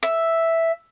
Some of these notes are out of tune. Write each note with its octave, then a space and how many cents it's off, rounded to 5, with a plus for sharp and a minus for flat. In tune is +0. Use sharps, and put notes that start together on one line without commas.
E5 +0